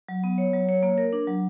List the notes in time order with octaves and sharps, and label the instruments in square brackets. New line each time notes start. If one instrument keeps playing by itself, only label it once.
[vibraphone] F#3
B3
C#5
F#3
C#5
A#3
A#4
D4
F#3